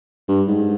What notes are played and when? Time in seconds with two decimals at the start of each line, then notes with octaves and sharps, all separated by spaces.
0.28 G2
0.48 G#2